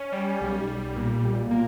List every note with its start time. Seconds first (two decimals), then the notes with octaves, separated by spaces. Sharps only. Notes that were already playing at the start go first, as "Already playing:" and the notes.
Already playing: C#4
0.12 G3
0.41 B1
0.67 G3
0.96 A#2
1.24 B1
1.51 A#3